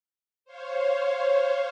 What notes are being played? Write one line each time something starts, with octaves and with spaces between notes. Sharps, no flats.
C5 C#5 F5